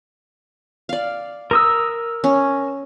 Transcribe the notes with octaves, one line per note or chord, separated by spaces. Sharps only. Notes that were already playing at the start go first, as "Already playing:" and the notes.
D5 F5
A#4 D#6 E6
C#4